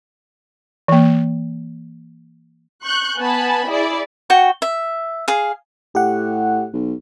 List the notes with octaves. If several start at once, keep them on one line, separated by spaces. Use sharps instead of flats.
E3 A#3
C#6 F#6 G6
B3 G#5 A5 B5
E4 G#4 D5
F#4 G5 C#6
E5
G#4 F5
A2 G4 F#5
B1